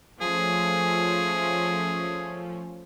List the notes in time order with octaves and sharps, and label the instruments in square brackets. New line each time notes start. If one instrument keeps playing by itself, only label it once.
[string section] F3 A3 C#4 [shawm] G#4